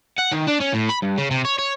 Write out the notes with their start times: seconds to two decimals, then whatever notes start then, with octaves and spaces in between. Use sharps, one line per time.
0.18 F#5
0.32 D#3
0.47 D4
0.60 C#4
0.73 A2
0.89 B5
1.02 G2
1.18 C#3
1.31 C3
1.45 C#5
1.59 C#5